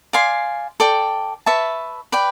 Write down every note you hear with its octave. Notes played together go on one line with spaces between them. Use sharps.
D5 F5 G#5 C6
A4 D5 G5
B4 E5 A5 C#6
B4 D5 G5